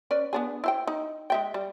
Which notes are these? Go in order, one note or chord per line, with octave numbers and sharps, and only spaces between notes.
C#4 B4 D5
B3 D4 G#4
E4 C5 G5
D#4
G#3 E5 G5
G3